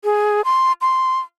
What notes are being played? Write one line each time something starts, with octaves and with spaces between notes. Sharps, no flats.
G#4
C6
C6